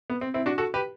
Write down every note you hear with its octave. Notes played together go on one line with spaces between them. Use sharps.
B3
C4
C4 E4
D4 F#4
F#4 A4
G4 B4